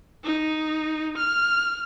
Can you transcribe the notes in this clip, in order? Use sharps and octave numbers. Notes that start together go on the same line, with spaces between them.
D#4
F6